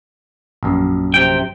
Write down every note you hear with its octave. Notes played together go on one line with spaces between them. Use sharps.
A#1 F#2
C3 G5